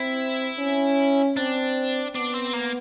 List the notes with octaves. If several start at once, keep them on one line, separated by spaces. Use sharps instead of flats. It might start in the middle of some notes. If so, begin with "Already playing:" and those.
Already playing: C4 E4
C#4
C4 D4
B3 D4
C4
A#3